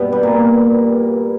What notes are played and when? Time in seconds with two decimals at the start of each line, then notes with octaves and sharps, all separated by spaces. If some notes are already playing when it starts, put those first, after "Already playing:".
Already playing: G2 B2 B3
0.12 G3
0.23 A#2 A#3